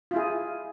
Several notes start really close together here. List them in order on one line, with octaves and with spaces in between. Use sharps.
F4 E4 G#4